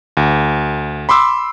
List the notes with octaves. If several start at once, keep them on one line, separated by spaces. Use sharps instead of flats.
D2
B5 C6 D6 E6